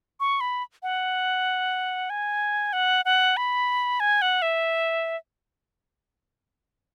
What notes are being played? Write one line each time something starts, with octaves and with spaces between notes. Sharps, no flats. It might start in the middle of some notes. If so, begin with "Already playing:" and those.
C#6
B5
F#5
G#5
F#5
F#5
B5
G#5
F#5
E5